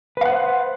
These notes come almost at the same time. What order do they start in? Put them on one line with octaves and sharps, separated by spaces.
B4 F5 F#5 C5